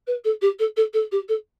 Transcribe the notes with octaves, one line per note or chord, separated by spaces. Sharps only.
B4
A4
G4
A4
A4
A4
G4
A4